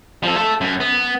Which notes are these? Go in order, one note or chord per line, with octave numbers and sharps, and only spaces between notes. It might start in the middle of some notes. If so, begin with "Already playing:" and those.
F3 A4
A3 A4
F#2
B3